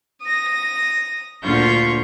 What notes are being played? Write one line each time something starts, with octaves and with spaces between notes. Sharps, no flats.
D#6 A#6
D2 A#2 D3 F4 C#6 G6